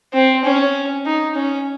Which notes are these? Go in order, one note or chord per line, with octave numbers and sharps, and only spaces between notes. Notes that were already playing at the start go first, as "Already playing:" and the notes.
C4
C#4
D#4
C#4